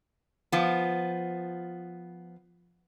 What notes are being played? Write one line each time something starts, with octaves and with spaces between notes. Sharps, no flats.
F3 B3